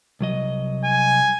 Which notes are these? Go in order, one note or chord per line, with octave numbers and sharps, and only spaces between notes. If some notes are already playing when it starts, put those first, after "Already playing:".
C2 F#3 D#5
G#5